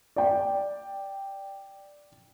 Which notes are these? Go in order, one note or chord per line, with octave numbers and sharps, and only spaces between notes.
D5 G5